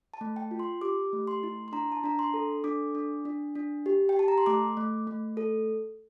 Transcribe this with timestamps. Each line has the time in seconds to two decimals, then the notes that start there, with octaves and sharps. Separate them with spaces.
0.14 A5
0.21 A3
0.36 G5
0.51 F4
0.59 C6
0.81 G4 D6
1.13 A3
1.27 C6
1.43 E4
1.68 C6
1.72 D4 A#5
1.92 A5
2.04 D4 A#5
2.19 C6
2.34 A4
2.64 D4 D6
2.95 D4
3.25 D4
3.55 D4
3.86 G4
4.09 G5
4.16 G4 A5
4.28 A#5
4.38 C6
4.46 A3 D6
4.77 A3
5.07 A3
5.37 A4